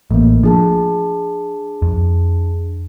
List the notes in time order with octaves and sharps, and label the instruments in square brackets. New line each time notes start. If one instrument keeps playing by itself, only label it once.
[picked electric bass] A1 [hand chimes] A3 A#3
[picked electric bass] F3 [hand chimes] D4 G#4 A5
[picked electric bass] F2